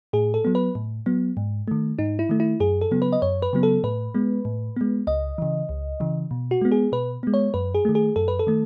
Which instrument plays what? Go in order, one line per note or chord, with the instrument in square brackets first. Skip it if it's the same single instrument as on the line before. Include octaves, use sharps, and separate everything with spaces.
[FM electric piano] A2 G#4
A4
F#3 B3
B4
A2
F#3 B3
G#2
D#3 A3
G#2 D#4
E4
D#3 A3
E4
F#2 G#4
A4
C#3 F#3 B3
B4
D#5
F#2 C#5
B4
C#3 F#3 B3
A4
A2 B4
G#3 B3
A2
G#3 B3
C#2 D#5
C#3 E3
C#2
C#3 E3
B2
F#4
G#3 B3
G#4
B2 B4
G#3 B3
C#5
F#2 B4
G#4
D#3 A3
G#4
F#2 A4
B4
A4
D#3 A3